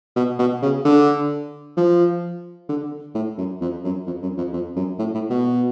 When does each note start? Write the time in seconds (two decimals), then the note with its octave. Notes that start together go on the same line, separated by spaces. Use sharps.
0.16 B2
0.39 B2
0.62 C#3
0.85 D3
1.77 F3
2.69 D3
3.15 A2
3.38 F#2
3.61 F2
3.84 F#2
4.07 F2
4.22 F#2
4.38 F2
4.53 F2
4.76 F#2
4.99 A2
5.14 A2
5.30 B2